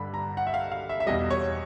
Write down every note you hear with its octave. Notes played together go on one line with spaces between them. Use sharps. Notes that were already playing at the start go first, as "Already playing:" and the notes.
Already playing: G2 D3 G3 B5
A#5
F#5
E5
F5
F5
E5
E5
E2 B2 G3 D#5
C#5